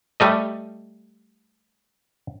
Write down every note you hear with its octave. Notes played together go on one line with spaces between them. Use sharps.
G3 A3 D#5